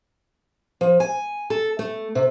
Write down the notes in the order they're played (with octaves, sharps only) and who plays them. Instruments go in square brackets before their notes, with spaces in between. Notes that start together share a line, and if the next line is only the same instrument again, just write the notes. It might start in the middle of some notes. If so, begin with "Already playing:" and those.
[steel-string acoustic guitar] F3
G#5
A4
A3
C3